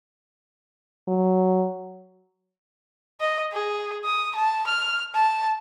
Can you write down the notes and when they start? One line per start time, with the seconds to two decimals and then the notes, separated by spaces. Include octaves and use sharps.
1.08 F#3
3.21 D#5
3.53 G#4
4.05 D#6
4.36 A5
4.68 F6
5.15 A5